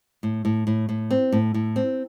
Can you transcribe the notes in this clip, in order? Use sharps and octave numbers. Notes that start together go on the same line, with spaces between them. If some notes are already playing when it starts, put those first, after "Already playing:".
A2
A2
A2
A2
C4
A2
A2
C4